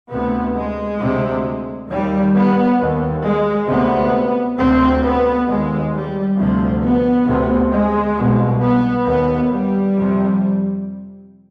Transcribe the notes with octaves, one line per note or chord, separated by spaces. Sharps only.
D2 C3 B3
G#3
D2 C3
D#2 G3
B3
D#2
G#3
D2 C3 B3
D2 C3 C4
B3
D#2 G#3
G3
D2 C3 F3
B3
D2 C3
G#3
C2 B2
B3
D#2 B3
G3
F2 C3